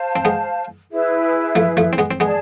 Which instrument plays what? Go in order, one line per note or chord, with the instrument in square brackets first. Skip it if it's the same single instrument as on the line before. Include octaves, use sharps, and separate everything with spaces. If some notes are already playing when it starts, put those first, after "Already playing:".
Already playing: [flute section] C5 F5 A5
[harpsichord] C4
G#3 B3
[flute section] E4 G#4 B4 E5
[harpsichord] F3 A3
F3 A3
C4
G#3 B3
C4
[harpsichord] G#3 B3 [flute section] G#4 D5 A5